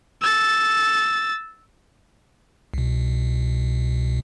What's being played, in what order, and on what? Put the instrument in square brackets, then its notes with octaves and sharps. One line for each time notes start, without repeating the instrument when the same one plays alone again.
[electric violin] E6 A6
[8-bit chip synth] C2 B2